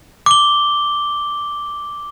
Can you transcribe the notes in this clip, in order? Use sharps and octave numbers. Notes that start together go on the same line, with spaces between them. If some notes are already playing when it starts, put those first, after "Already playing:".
D6 G7